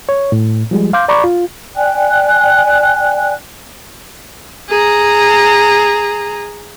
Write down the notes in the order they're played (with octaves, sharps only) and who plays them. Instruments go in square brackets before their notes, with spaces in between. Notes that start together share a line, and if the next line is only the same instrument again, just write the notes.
[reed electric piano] C#5
A2
F3 G3 G#3
F5 C6 D6 G6
D5 A#5 B5 C#6 D6
F4
[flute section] D5 G5 G#5 F#6
[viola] G#4 A#5